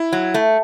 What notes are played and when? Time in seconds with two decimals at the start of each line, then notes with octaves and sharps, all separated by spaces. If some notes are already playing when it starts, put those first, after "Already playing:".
Already playing: E4
0.13 F#3
0.34 A3